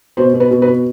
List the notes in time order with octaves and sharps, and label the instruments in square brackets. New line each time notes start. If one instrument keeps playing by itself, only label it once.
[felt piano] B2 C5
B2
B4
B2
B4
B2